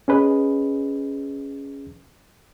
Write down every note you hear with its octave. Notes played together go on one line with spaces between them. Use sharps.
C#4 G#4 B4 D#5